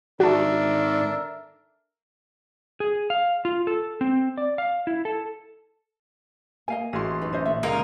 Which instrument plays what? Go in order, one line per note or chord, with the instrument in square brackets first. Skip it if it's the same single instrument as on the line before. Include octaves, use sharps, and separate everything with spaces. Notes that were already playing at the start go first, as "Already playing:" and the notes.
[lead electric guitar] G#2 D#3 [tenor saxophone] D4 [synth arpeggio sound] F#4 A5 [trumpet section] A4 A#4 E5
[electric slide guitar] G#4
F5
F4
A4
C4
D5
F5
E4
A4
[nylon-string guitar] A#3 [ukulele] D#5 F5 G#5
[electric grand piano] A1 C6 [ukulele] E4 F#4 G#4
[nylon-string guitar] F#2 D#4 B4
[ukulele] C#4 C5 D#5
[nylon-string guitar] A#2 D3 [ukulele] E5
[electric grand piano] C#2 [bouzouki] A#3 D#4 F4 [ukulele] G#4